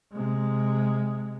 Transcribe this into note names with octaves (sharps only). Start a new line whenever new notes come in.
C3 G#3